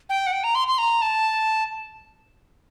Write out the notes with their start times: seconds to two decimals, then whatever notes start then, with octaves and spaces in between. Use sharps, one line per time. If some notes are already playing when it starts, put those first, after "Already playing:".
0.09 G5
0.26 F#5
0.32 G5
0.44 A#5
0.55 C6
0.68 C6
0.78 A#5
1.02 A5